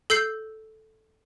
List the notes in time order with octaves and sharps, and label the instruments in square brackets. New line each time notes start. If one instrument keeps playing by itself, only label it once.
[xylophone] A4 E6 G6 C7